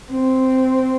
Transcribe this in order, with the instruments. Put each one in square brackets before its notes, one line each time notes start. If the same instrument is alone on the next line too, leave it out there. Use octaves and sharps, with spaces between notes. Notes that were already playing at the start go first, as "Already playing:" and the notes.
[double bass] C4